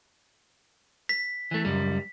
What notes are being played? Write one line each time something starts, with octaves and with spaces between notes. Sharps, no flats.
B6
E3 A3
C#2 F#2 G3